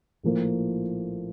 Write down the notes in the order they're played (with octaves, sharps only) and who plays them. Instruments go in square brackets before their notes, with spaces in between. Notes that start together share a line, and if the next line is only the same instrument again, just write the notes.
[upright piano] A#1 A2 F3 A#3